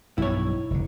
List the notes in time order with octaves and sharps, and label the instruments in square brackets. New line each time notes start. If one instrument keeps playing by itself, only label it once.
[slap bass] B1 G2 [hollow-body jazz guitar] E4 C#5
[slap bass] F1 D3